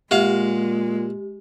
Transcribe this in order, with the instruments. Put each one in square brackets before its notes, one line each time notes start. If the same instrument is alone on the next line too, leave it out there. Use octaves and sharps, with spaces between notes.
[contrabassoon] A#2 [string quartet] G#3 [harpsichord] F#4 F5 [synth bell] G4